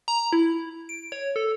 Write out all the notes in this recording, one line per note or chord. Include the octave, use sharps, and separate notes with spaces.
A#5
E4
D7
C#5
A4